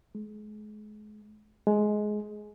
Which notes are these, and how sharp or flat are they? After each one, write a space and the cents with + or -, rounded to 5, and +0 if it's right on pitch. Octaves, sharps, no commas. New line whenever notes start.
G#3 +35
G#3 +15